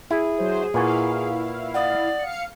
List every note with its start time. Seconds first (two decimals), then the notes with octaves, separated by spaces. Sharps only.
0.11 E4 G#4
0.38 F#3 C5
0.74 A#2 E4 B4 F5 F#5 G#5 C#6
1.74 D5 F#5 D#6 A6
2.19 F5 C#7